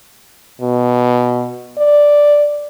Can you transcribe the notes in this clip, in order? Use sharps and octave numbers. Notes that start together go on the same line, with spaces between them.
B2
D5